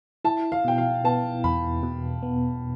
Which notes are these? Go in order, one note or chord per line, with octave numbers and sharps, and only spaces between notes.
E4 A5
F5
B2 G5
F5
B3 A5
E2 B5
B2
B3